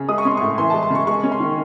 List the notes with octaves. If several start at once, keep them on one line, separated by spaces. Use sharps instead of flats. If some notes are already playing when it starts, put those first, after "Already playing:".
Already playing: C#3
G#3 D#6
C#6
C#4 C6
A2 C#6
E3 C6
G#3 A5
C6
C#3 C#6
G#3 C#6
C#4
C6
D#3